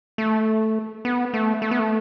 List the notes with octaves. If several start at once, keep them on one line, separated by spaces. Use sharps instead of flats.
A3
B3
A3
A3
B3
A3